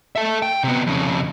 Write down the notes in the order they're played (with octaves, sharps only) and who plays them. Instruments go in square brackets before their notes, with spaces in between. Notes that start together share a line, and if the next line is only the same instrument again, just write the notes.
[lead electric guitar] A4 E5
G5
C3 B3
F2 C#3